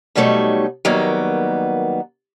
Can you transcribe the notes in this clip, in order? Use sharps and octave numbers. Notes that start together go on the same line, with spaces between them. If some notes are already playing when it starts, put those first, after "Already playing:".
B2 F#3 G3 A3 D#4 C#5
D#3 F#3 G3 A#3 B3